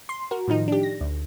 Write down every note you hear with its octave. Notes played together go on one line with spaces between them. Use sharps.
C6
F#4 A#4
A2 D#3 F3 D#4
D4 G4
A#6
D2